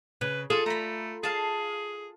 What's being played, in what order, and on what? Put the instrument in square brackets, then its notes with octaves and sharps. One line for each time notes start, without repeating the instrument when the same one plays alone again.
[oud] C#3 [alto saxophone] B4
[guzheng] F4 [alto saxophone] G#4 [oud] A4
[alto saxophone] A3 [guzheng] A#5 B5
[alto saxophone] G#4 [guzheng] F5 A5